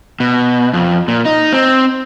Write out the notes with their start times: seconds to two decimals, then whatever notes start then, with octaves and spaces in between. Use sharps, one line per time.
0.20 B2
0.73 F2
1.08 A#2
1.25 D#4
1.53 C4